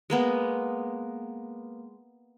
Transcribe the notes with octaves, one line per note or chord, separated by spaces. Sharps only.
G#3 A#3 B3